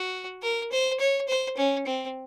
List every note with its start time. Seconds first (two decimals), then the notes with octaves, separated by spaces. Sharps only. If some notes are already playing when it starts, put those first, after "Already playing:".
Already playing: F#4
0.42 A#4
0.72 C5
1.00 C#5
1.28 C5
1.57 C#4
1.86 C4